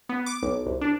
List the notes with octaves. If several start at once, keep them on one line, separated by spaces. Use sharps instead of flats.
B3
D6
B1
C2
D4